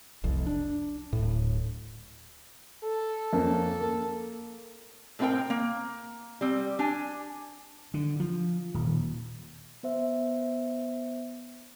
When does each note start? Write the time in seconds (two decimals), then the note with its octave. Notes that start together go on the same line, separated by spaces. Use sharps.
0.23 F1 C2 F2
0.47 D4
1.13 D1 A2
2.84 A4
3.33 F2 A#3 C#4
3.81 A#3
5.19 A2 G#3 C4 D#4 A#4 G5
5.50 A#3
6.41 G3 C4
6.79 D4 G4 G#5
7.94 D3
8.20 F3
8.74 D#1
9.83 B3 C5 E5